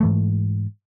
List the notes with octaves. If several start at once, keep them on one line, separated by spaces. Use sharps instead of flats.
G#2 E3 A3